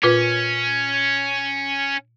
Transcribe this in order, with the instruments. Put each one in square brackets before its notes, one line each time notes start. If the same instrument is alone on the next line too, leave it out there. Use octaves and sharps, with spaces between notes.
[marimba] A#2 F4 B4 [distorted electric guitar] C#4